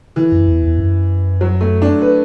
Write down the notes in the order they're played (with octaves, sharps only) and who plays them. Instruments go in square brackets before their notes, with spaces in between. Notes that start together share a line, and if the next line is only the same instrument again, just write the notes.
[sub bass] D3 [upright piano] E3
[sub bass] F#2
E2
E2
F#2
[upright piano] F#3
A3
D4
B4